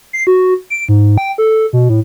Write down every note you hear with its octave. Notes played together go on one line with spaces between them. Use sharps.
C7
F#4
D7
G#2
G5
A4
B2
A2